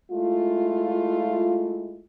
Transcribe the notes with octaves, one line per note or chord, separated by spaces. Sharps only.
G#3 A3 E4 F4